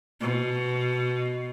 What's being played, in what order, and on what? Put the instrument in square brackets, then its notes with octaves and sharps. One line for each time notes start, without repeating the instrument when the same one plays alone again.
[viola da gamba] B2